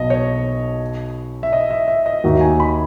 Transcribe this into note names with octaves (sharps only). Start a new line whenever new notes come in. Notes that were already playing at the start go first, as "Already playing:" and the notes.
Already playing: B1 B2 D#5
C#5
E5
D#5
E5
E5
D#5
D#2 D#3 A#3 D#4 F#4 E5
G#5
B5